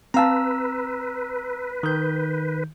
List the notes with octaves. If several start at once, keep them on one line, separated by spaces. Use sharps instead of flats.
C4 B4 F5 A5 A#5 E6
D#3 G6